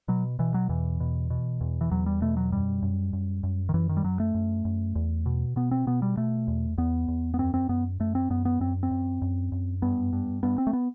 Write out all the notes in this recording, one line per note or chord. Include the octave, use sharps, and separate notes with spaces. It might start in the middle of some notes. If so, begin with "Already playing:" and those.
B2 F#3
B2 E3
F#3
E2 E3
B2
B2
E2
E3
E2 F#3
G3
B2 A3
F#3
F#2 G3
F#2
F#2
F#2
D#3
F#2 E3
D#3
G3
F#2 F#3
A3
F#2
F#2
E2
B2
B2 B3
C4
B2 B3
G3
B2 A3
E2
E2 B3
E2
B3
F#2 C4
C4
F#2 B3
F#2 A3
C4
F#2 B3
B3
F#2 C4
C4
F#2
F#2
F#2
G2 B3
G2
G2 B3
C4
A3
B3